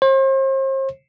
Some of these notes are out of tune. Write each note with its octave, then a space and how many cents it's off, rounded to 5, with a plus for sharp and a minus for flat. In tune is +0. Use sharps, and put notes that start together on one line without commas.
C5 +40